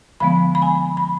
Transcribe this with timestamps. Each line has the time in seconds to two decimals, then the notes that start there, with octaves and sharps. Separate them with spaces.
0.20 D3 F3 G#3 B3 B5
0.55 B5
0.62 G#5
0.97 B5